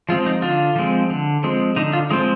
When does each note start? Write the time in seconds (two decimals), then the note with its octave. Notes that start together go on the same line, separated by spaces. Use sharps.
0.09 F3 G#3 C4 F4
0.26 D#4
0.42 D3 F4
0.76 F3 G#3 C4
1.10 D3
1.44 F3 G#3 C4
1.76 D3 D#4
1.93 F4
2.10 F3 G#3 C4 D#4